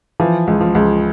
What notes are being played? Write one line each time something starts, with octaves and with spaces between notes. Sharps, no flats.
E3 F3
C#2
F3
C#2